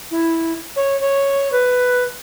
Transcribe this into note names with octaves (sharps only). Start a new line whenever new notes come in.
E4
C#5
C#5
B4